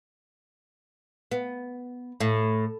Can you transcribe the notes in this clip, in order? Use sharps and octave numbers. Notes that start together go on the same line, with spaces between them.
B3
A2